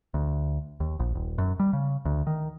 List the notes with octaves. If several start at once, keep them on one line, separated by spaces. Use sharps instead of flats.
D2
D#2
A#1
D#1
F#2
G3
C#3
D2
D#3